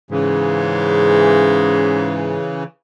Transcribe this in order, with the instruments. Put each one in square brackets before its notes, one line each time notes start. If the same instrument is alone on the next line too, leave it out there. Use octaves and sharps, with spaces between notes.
[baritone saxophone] G#2 [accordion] C#3 E3